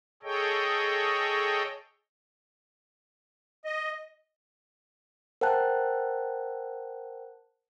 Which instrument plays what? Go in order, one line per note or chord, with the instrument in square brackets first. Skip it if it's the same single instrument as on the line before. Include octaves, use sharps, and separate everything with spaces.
[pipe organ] G#4 A4 C#5 D#5 G5
[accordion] D#5
[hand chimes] A#4 C5 F#5 G5 A5 F#6